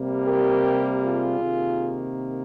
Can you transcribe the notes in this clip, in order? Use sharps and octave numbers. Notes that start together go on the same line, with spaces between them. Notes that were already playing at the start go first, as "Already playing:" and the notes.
Already playing: C3 G3 A#3
G4 A#4
F4 G#4
C3 D#3 A#3